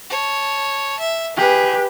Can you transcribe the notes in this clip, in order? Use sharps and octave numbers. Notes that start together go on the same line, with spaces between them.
C#5 A5
E5
G4 G#4 B4